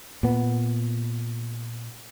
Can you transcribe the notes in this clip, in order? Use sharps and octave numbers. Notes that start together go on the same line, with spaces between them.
A#2 B3